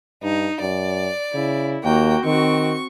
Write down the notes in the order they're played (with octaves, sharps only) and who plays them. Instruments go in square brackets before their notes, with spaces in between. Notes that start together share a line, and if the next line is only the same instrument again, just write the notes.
[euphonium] G2 [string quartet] D#4
[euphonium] F#2 [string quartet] D5
[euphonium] C#3 [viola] E4
[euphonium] D#2 [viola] A#3 F#4 [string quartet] G5
[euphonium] D#3 [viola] C4 F#4 [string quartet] C#6